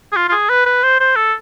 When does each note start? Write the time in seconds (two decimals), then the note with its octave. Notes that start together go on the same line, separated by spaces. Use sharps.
0.12 G#4
0.16 F4
0.29 F4
0.32 G#4
0.50 B4
0.66 B4
0.83 C5
1.00 C5
1.16 A4